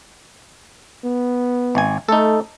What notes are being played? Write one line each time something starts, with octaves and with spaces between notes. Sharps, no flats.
B3
G#1 G#5
A3 D#4 A4